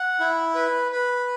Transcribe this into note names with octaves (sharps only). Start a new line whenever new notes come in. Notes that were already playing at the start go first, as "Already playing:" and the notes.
Already playing: F#5
E4
B4
B4